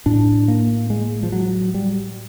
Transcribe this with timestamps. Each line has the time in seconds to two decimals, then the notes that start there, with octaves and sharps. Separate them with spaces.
0.06 A2 D4
0.48 A#3
0.90 G#3
1.23 F3
1.32 F#3
1.74 G3